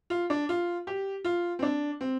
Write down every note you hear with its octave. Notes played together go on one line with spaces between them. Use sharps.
F4
D4
F4
G4
F4
C4
D4
C4